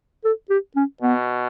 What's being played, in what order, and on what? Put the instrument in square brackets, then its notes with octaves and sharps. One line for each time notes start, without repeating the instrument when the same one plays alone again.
[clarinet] A4
G4
C#4
[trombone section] B2 [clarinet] B3